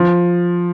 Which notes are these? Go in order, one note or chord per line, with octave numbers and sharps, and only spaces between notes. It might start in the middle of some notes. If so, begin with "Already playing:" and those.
Already playing: F3